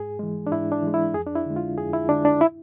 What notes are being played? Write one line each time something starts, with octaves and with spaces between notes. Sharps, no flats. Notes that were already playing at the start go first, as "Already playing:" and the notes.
Already playing: G#2 G#4
E3 G#3
D4
G#2 E4
D4
E3 G#3
E4
F2 G#4
D4
E4
D3 G#3
F4
F2 G#4
E4
D3 G#3 D4
D4
E4